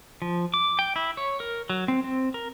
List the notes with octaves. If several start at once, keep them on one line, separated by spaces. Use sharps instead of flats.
F3
D6
G5
E4
C#5
A#4
F#3
C4
C4
A#4